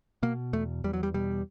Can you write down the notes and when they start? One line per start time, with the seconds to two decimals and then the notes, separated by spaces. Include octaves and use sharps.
0.23 B2 A#3
0.53 E2 A3
0.84 E2 G3
0.93 F#3
1.03 G3
1.14 B2 G3